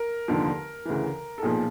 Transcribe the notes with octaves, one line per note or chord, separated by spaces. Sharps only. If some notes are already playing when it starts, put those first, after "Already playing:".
Already playing: A#4
F1 D#2 D3 F3
D2 C#3 E3
A4
B1 A#2 F3 G#4